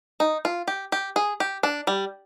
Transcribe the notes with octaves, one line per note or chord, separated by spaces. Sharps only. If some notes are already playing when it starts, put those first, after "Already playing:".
D#4
F4
G4
G4
G#4
G4
D4
G3